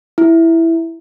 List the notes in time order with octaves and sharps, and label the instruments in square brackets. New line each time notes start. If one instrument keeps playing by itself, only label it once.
[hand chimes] E4